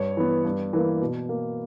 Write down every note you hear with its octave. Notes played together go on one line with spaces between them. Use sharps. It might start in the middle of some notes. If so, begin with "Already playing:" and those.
Already playing: G2 C#5
E3 B3
G2
E3 A#3
B2
A#3